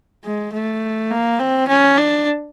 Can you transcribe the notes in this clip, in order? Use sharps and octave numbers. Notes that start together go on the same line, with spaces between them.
G#3
A3
A#3
C4
C#4
D4